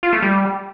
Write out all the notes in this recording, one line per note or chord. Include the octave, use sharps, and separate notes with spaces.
F4
A3
G3